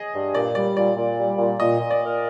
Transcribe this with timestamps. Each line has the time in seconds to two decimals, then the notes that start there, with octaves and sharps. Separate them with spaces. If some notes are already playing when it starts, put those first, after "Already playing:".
Already playing: G#4 D#5
0.14 G2
0.35 A#2 D5
0.55 G3 D5
0.76 A#2 D5
0.97 A#2
1.18 G3
1.38 A#2
1.60 A#2 D#5
1.80 A#2
1.91 D5
2.02 A#4